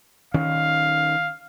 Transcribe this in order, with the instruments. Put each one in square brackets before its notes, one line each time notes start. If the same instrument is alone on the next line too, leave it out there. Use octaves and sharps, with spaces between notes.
[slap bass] D#3 C#4 [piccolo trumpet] F5